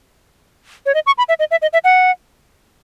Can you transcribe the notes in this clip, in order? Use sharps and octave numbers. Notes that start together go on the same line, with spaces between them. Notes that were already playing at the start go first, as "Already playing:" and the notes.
C#5
D#5
C#6
B5
E5
D#5
E5
D#5
E5
F#5